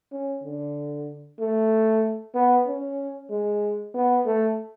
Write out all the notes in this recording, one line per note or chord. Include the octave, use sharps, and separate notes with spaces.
C#4
D3
A3
B3
C#4
G#3
B3
A3